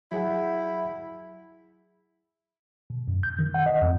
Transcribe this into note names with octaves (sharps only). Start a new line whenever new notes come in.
F#3 E4 G#4 F#5
B2
F#2
G6
D#3
F#5
D#5
F2